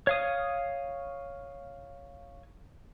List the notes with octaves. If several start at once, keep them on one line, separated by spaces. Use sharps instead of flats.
C#5 F5 D#6